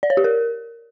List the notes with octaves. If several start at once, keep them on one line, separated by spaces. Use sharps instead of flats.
D5
C#5
G4
A#4